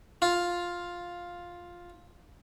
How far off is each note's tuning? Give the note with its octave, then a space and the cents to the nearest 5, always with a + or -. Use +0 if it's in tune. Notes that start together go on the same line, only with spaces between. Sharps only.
F4 +5